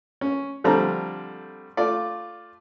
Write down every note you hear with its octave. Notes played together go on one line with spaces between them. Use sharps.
C#4
D3 F3 G3 A3 C4 A#5
A3 F4 D5